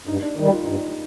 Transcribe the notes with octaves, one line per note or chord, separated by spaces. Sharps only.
G2 D#4
D4
D#3 G3 D#4
F4
G2 D#4